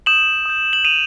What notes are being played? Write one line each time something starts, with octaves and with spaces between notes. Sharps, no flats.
D#6 G6 E7 F#7
D#6 G6
F#7
D#6 G6 D#7 F7